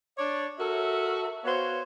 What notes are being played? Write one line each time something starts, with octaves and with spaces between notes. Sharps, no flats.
D4 C#5 D5
F#4 A4 A#4 E5
B3 F#4 C5 C#5 F5